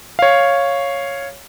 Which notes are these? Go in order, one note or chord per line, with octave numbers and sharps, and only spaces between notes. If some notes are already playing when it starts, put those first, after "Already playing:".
C#5 F5